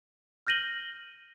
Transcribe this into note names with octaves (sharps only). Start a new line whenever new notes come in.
F6 G6 A#6 D#7 F#7 G7